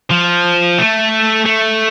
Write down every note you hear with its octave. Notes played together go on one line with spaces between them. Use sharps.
F3
A3
A3